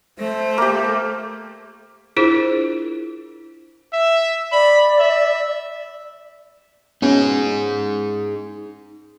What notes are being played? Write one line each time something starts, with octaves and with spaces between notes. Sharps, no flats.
A3 C5
A#3 G4
D4 E4 F4 G#4 A#4 C5
E5
D5 B5
E5
B3 C#4 D#4 G#4